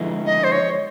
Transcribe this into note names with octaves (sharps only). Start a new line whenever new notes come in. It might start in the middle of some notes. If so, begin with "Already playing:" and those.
Already playing: D3 F3 G#3 B3 E4
D#5
C5
C#5